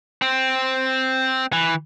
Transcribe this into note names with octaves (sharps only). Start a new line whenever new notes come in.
C4
E3